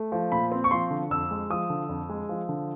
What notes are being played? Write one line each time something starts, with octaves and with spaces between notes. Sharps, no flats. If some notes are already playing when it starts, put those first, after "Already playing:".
Already playing: A3
F3
A#2 B5
C4
C#6
F3 C6
D3
F2 E6
G#3
F3 D#6
D3
F2
G#3
F3
D3